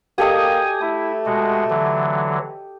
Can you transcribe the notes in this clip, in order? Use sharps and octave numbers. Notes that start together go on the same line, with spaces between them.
A#3 G4 A4 D#5 G#5 D#6
A3 E4
B2 G#3 F#4
D3 E3 F#3